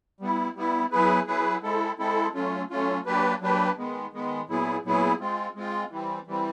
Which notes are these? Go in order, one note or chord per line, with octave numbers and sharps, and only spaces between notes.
G3 B3 E4
G3 B3 E4
F#3 B3 E4 G#4 B4
F#3 B3 E4 G#4 B4
G#3 C4 E4 A4
G#3 C4 E4 A4
F#3 A3 C#4 F4
F#3 A3 C#4 F4
F#3 A#3 D4 G4 B4
F#3 A#3 D4 G4 B4
D#3 G#3 B3
D#3 G#3 B3
A#2 F#3 B3 E4 G#4
A#2 F#3 B3 E4 G#4
G#3 C4 F4
G#3 C4 F4
E3 G3 C4
E3 G3 C4